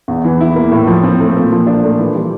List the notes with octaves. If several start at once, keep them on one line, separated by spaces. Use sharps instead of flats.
E2
E3
E4
A#3
A2
F3
C4
A3
A#2
F3
D4
A3
E3
G3